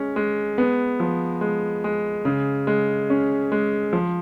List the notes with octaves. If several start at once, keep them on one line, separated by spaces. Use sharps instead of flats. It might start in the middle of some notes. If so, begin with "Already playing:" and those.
Already playing: G#3 C#4
G#3
B3
F3
G#3
G#3
C#3
G#3
C#4
G#3
F3